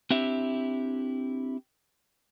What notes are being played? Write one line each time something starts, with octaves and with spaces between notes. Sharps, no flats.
C4 D4 E4 G4 E5